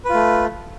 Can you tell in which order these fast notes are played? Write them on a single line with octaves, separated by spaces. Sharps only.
B4 F4 A3